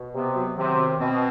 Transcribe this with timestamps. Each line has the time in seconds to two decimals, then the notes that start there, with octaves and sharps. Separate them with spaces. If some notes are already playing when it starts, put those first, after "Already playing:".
Already playing: B2
0.15 C3 B3
0.36 F#3
0.57 C3 D#3
0.78 C4
0.99 B2 C4